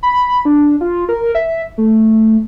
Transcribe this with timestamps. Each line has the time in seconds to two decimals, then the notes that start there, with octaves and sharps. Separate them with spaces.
0.03 B5
0.45 D4
0.81 F4
1.09 A#4
1.35 E5
1.78 A3